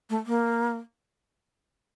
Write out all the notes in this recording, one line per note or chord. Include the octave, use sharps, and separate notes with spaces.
A3
A#3